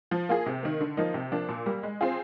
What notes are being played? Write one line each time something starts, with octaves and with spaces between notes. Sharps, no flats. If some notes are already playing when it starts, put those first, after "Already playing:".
F3
A#3 F4 G#4
C3
D#3 A#3
D3
F3 A#3 D#4
C3
F3 A#3 D4
A#2
G3 A#3
G#3
C4 F4 G#4